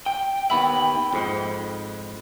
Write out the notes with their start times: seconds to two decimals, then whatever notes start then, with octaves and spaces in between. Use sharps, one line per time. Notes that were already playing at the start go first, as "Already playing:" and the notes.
0.06 G5
0.50 D#2 B3 E5 B5 F#7
1.13 F2 G#2